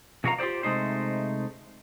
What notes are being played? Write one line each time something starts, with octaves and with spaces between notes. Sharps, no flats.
B2 F3 F#4 G4 F5 A#5
F4 G4 G#4 C5 D5
C3 G#3 A3 D#4 C5